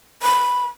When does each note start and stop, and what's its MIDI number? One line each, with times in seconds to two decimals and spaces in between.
0.23 0.66 83